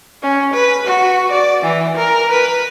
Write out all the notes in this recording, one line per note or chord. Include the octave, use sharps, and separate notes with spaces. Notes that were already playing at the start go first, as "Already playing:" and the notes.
C#4
B4
F#4
D5
E3
A#4
B4